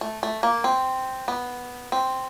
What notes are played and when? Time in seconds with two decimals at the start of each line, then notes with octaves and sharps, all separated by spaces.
0.01 A3
0.23 A3
0.43 A#3
0.64 C4
1.28 B3
1.92 C4